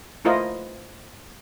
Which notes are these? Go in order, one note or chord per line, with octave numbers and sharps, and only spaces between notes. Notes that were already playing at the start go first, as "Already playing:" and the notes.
A3 E4 F4 A#4 C5 D#5